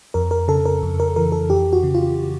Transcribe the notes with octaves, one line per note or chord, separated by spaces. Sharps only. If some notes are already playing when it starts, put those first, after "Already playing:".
F2 A#4
A#4
C#3 A4
A#4
F2
A#4
E3 A#4
A4
F2 G4
F#4
C#3
F4